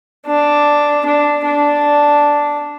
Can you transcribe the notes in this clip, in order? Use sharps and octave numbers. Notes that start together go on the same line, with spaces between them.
D4
D4
D4